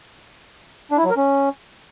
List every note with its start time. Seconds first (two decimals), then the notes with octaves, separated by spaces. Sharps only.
0.91 D4
0.98 E4
1.04 F#3
1.10 A#4
1.17 C#4